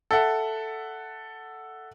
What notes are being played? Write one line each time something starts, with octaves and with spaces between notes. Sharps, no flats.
A4 E5 F#5